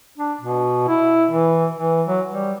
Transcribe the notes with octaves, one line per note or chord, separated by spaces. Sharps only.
D4
B2
E4
E3
E3
F#3
G3